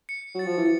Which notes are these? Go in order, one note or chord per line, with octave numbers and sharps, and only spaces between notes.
C#7
F#3 A6
F3
E3